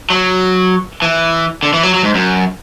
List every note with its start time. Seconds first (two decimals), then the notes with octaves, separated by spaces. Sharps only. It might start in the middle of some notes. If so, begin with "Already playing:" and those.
0.10 F#3
1.02 E3
1.63 D3
1.73 E3
1.83 F#3
1.94 F#3
2.03 G#2
2.15 F#2